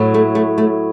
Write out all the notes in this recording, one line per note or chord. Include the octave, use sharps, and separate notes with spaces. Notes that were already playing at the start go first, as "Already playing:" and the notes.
Already playing: A2 F#3
A3
A3
A3